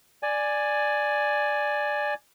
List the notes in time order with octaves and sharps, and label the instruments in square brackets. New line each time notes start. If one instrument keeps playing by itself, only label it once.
[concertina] D5 G#5